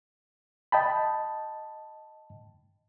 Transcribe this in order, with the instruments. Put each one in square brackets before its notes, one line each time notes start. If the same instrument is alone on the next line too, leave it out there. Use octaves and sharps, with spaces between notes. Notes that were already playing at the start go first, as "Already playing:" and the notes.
[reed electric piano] D#5 G5 A5 B5